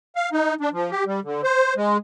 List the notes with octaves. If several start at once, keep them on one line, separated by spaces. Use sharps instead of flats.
F5
D#4
D4
F3
G4
G3
D3
C5
G#3